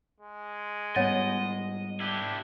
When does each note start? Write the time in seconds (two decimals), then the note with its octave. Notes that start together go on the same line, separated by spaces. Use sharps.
0.20 G#3
0.96 G#2 G3 B3 C#5 D#5 F#5 A6
2.00 D4 E4 G4